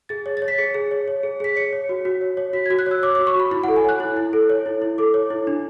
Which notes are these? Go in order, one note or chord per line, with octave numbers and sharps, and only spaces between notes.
G#4 A6
C#5
A6
C#5
B6
G#4 C#7
G#4
C#5
C#5
G#4
G#4 B6
C#5 C#7
C#5
F#4
F#4
C#5
C#5
F#4 B6
G#6
F#4
F#6
C#5 E6
C#5 D6
D6
F#4
C#6
F#4 B5
E4 B5
F#5
A4
G#5
C#5 F#6
E4
E4
A4
C#5
E4
E4
A4 D6
C#5
E4
D4